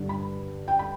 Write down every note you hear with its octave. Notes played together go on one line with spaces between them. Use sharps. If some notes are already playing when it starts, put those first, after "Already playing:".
Already playing: G2 D3 G3
B5
G5
B5